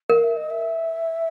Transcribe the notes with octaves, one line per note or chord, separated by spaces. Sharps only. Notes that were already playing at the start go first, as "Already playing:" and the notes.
A#4 F5
E5
D#5
E5